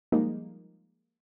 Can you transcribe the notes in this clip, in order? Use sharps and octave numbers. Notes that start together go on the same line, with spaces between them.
F3 G3 G#3 A#3 D#4